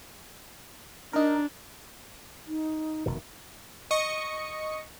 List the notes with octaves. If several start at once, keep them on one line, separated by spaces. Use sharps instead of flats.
D4 D#4 A#4
D#4
F1 B2 D#3
D#5 C#6 C#7